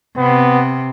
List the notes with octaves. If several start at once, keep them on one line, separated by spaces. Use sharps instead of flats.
C3 B3